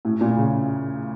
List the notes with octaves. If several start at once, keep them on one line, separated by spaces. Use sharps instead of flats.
A2
A#2
C#3